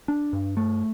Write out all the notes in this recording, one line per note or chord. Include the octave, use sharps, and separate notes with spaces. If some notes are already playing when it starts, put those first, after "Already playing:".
D4
G2
A3